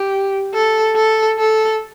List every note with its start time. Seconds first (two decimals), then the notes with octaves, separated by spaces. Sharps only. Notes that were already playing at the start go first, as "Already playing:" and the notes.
Already playing: G4
0.54 A4
0.96 A4
1.39 A4